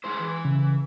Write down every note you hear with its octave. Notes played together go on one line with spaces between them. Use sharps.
G#3 E4 C5
E3
C#3